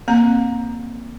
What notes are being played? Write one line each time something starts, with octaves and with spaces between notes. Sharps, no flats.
A#3 C4 A#5